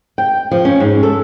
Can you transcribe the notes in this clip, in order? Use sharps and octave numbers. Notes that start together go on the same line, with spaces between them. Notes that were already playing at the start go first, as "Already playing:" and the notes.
G5
F3
C#4
G#2
A4